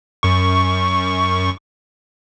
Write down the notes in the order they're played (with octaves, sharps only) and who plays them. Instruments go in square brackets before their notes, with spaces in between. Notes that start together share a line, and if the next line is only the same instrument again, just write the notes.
[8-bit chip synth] F#2 C#6